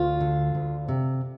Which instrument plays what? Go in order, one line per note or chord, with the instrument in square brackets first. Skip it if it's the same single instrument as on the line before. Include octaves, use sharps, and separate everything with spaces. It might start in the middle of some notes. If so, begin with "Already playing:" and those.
Already playing: [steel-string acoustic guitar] D2 F4
D3
D2
C3